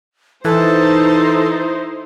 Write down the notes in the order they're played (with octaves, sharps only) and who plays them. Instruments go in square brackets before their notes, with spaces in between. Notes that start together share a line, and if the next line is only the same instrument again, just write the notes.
[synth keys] E3 [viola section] D#4 E4 C5 [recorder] A4